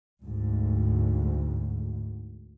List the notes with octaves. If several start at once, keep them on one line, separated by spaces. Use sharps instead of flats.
D2 G#2